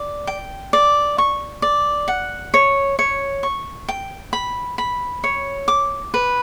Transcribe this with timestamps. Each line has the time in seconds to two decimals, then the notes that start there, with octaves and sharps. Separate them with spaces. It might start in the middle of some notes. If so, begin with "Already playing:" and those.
Already playing: D5
0.27 G5
0.73 D5
1.18 C#6
1.62 D5
2.08 F#5
2.54 C#5
2.99 C#5
3.43 C#6
3.88 G5
4.33 B5
4.78 B5
5.24 C#5
5.68 D6
6.14 B4